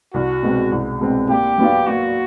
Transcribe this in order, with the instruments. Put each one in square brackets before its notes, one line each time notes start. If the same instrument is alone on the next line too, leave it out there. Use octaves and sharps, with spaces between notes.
[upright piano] C2 [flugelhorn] F#4
[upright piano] B2 G#3 C4
C2
B2 G#3 C4
[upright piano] A#2 [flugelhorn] G4
[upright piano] F#3 B3 D4 F4
[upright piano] A#2 [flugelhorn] F#4